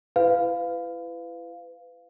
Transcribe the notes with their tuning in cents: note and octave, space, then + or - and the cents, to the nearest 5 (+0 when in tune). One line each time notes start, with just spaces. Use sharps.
E4 +30 B4 +30 F5 +0